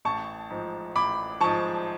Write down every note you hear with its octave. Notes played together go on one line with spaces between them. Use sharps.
A1 A5 C#6
G#2 F3
A1 B5 D6
G#2 F3 A5 C#6